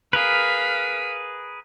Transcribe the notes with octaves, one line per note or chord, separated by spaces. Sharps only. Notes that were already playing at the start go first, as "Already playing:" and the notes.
G#4 A#4 B4 F5 B6